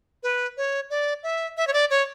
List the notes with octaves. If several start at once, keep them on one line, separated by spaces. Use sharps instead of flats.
B4
C#5
D5
E5
E5
C#5
D5
C#5